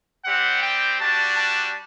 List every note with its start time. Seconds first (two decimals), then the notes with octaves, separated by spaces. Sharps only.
0.25 G3 C4 G4 F#5
0.63 G5
1.00 G3 D4 F#4 A5
1.36 A5